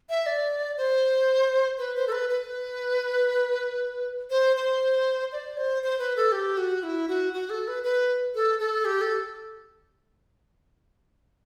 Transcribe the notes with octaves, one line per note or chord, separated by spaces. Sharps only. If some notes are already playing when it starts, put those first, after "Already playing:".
E5
D5
C5
B4
C5
A4
B4
B4
C5
C5
D5
C5
C5
B4
A4
G4
F#4
E4
F#4
F#4
A4
B4
B4
A4
A4
G4
A4